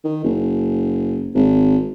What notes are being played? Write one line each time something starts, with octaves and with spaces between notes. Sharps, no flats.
D#3
F#1
G#1